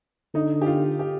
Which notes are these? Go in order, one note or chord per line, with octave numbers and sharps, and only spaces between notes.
D3 D#4
G4
F4
G4